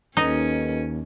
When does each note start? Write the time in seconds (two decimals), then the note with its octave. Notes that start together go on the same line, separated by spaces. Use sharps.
0.17 D#2 C#4 D#4 A4 B4 D#5